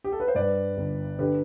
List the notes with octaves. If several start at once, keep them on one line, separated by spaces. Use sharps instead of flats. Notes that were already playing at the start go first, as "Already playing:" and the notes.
G4
A4
B4
C5
G2 B4 D5
G1
D3 G4 B4